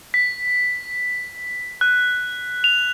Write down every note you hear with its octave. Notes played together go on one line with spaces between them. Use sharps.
B6
F#6
F7